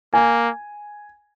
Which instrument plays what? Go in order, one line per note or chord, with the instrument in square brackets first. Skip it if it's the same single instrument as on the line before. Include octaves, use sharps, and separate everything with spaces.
[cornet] A#3 [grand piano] G#5